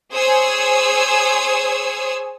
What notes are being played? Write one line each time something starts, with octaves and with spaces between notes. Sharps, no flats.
G#4 C5 C#5 G#5 D#6 E6